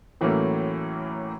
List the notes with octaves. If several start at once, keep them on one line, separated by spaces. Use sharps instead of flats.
A2 E3 F#3 A3 A#3 C#4